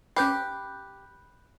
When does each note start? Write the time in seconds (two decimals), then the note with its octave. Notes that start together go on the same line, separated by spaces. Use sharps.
0.16 C#4 G4 B4 B5 F#6 G6 C7